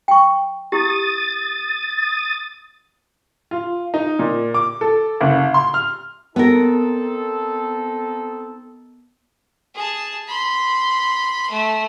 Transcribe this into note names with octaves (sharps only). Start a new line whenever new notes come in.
G5 C#6
E4 G4 D#6 A6
F4
D#4
A#2
D6
A4
F#1
C6
F6
B3 C4 D#4 A4 A#4
G#4 A5
B5 C6
A3